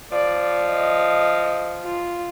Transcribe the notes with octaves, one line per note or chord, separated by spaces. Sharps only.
F3 D5
D#5
F4